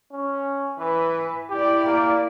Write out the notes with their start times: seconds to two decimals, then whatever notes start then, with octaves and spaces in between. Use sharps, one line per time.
0.12 C#4
0.78 E3 B4
1.50 E4 G4 D5
1.85 A#3